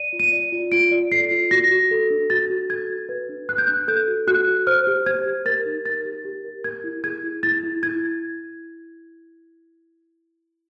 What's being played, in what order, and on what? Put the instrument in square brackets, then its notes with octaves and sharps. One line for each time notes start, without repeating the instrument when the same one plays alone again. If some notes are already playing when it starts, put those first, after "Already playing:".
Already playing: [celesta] D5 D#7
F4
D#7
D5
F4
F4 D7
D5
A4 C7
F4
F#4 A#6
F#4
A4
D4
F#4 A6
F#4
A4 G#6
F#4
B4
D4
B4 F#6
G6
D4 F#6
A4 G6
F#4
F#4 F#6
F#4
C5 F6
G4
C5 G#6
G4
A#4 A6
D#4
A#4 A6
G4
G4
A#4
A#4 G#6
E4
G#4 G#6
E4
E4 A6
E4
E4 G#6